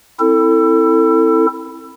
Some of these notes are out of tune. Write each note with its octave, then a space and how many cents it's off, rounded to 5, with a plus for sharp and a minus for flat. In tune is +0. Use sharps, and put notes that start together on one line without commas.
C4 +20 E4 +0 A4 +25